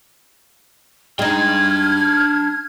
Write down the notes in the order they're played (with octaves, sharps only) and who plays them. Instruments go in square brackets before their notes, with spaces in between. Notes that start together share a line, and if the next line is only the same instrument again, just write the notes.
[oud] G#3 D#4 [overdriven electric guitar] D4 G5 [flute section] F6 G#6